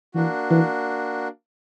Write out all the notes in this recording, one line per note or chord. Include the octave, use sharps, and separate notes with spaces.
E3 A#3 D4 F#4
E3